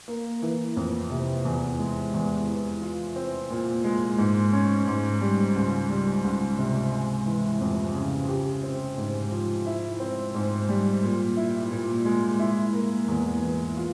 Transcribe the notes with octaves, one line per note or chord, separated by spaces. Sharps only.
A#3
E3
F2
C3
E2
G#3
E2
E3
F4
C4
A#2
G#3
G#2
C#4
G#2
G3
C#2
G3
C#2
C3
G#3
E3
F2
C#3
G4
C4
G#2
F3
E4
C4
G#2
G3
A#2
E4
A#2
G#3
E4
A#3
E2
E3
F4